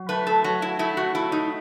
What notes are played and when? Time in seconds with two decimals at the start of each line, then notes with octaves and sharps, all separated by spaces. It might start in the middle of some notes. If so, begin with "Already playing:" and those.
Already playing: F#3
0.09 A3 B4
0.27 A4
0.44 F#3 F#4
0.62 E4
0.79 A3 E4
0.97 F#4
1.15 A3 E4
1.32 D#4